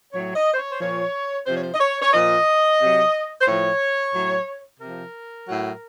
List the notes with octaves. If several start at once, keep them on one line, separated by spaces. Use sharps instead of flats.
A2 F#3 C#5
D#5
C5
C#5
C5
A#2 F3 C#5
C3 F3 C5
C#5
C5
D#5
C#5
C#5
A#2 F3 D#5
C3 F#3
C5
A2 F3 C#5
A2 F#3
C3 F3 A#4
A2 F#3